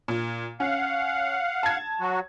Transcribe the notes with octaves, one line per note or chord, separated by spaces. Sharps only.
A#2
C#4 F5 F#5
A5 G#6
F#3 F#4